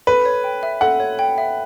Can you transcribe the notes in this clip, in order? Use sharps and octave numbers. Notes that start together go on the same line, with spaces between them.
A4 B4
C#5
G5
E5
A4 F#5
C#5
G5
E5